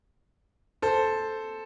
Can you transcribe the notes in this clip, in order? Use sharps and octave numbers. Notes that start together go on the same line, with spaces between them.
A4 C5